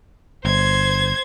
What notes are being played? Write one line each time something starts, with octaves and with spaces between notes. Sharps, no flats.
G1 C5 G#6